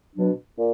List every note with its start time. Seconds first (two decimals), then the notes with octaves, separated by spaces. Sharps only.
0.16 B2 F#3 D4
0.58 A#2